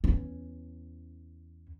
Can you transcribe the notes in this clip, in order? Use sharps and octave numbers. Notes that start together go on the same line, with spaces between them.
E2 C#4